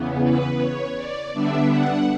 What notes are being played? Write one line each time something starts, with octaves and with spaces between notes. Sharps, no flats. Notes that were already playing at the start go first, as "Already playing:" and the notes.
Already playing: E2 C#3 E3 B3
B4
C#5
D5
D3 G3 B3 D4 E5
F#5